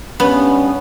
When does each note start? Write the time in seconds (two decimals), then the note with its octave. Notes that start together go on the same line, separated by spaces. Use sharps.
0.20 G2 B3 C#4